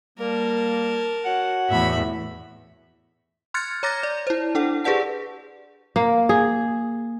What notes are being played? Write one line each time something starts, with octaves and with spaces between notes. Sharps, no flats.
G3 A#3 A#4 A5
F#4 C#5 F#5
E2 A2 E5 B5
C6 F6 F#6 G#6 A6 C#7
C#5 A#5 D6 F6 A6 A#6
D5
E4 C5
D4 A4 F#5
G4 G#4 B4 D5 F#5 A5
A#3
G#4